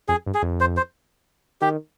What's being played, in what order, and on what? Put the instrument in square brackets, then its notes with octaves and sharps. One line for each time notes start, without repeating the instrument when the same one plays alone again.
[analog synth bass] F2 [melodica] G#4
[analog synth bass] G2
[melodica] G#4
[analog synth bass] F2
[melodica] C5
C5
[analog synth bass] D#3 [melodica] G4